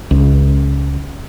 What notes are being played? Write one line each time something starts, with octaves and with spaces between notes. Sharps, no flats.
C#2